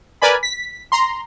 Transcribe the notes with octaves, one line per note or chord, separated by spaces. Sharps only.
A#4 B4 D5 G#5 B5
B6
A#5 C6